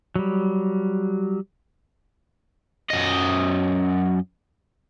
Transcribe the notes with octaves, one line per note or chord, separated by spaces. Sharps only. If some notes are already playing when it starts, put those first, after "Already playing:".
F#3 G3
F#2 D#5